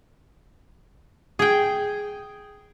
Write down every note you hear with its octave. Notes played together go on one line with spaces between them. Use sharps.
G#4 G5